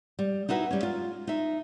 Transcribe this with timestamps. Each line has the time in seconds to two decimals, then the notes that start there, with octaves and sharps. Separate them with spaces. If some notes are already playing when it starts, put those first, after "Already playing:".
0.19 G3
0.49 D#4 E4 F#4 B4
0.71 G3 C#4
0.83 F4
1.27 D#4 E5